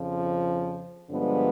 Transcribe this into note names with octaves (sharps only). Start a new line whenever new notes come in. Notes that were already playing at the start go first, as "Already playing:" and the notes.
Already playing: F2 C#3 F3
G2 D3 F3 G#3 B3